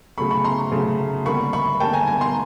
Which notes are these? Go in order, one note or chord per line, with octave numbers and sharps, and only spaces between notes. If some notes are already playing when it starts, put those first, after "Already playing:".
C#3 F#3 A3 B5 C#6
B5 C#6
A#5 C6
C#3 F#3 A3
D3 G3 A#3 B5 C#6
B5 C#6
D3 G3 A#3 G5 A5
G#5 A#5
G#5 A#5
A#5 C6